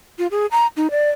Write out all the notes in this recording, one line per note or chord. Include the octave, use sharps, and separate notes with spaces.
F4
G#4
A#5
D#4
D5